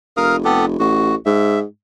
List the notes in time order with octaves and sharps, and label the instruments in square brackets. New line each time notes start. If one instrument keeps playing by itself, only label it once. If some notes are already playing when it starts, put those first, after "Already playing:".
[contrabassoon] F1 [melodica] A#4 F5 D#6
[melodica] B3 G4 A4
[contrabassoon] A1 [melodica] F#4
[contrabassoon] G#2 [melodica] E5